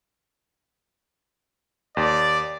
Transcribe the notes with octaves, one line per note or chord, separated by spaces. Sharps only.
D#2 D5